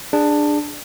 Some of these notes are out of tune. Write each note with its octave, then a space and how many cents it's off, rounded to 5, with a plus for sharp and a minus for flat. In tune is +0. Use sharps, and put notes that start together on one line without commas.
D4 +10 G#4 -15